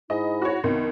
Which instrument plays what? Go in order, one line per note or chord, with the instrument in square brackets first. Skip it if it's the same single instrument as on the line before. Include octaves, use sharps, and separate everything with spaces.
[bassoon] G#2 [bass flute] E4 [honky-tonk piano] D#5
[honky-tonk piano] F#4 C#5
[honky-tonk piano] C2 [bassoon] D#3 [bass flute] B3